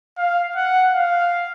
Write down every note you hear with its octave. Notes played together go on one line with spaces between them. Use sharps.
F5
F#5
F5